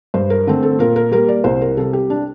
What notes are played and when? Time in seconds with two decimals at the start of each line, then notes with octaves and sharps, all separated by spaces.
0.14 G2 C5
0.30 A#4
0.47 D3 A3 C4
0.63 A4
0.79 A#2 A#4
0.96 A#4
1.11 G3 A#3 A#4
1.28 D5
1.44 C2 C5
1.61 A#4
1.77 C3 G3 A4
1.93 G4
2.10 D4